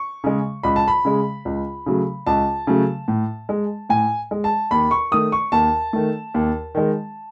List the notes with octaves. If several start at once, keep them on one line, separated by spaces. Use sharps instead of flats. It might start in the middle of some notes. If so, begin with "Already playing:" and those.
Already playing: C#6
C#3 G#3
C#2 B5
A5
B5
C#3 G#3
C#2
C#3 F#3 A3
C#2 A5
C#3 F#3 A3
A2
G#3
A2 G#5
G#3
A5
D#2 B5
C#6
D#3 A3 D#6
C#6
D#2 A5
D#3 A3
D#2
D#3 G#3